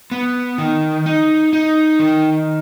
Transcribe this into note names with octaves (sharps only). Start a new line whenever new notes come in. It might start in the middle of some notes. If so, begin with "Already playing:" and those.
B3
D#3
D#4
D#4
D#3